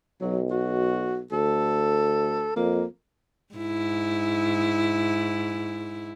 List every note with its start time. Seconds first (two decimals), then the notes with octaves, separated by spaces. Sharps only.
0.21 B1 F#3
0.50 F#4
1.32 D2 A4
2.57 F2 A#3
3.55 G#2 E4